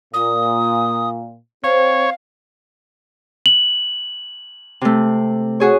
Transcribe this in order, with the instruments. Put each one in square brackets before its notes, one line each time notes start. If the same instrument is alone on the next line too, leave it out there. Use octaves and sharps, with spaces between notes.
[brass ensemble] A#2 [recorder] D#6
[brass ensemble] C4 C5 [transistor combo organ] C#5 [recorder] F5
[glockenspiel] F#7
[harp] C3 A3
F#4 G#4 C#5